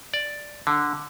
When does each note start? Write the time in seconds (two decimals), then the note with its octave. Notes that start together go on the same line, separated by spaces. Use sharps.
0.14 D5
0.67 D3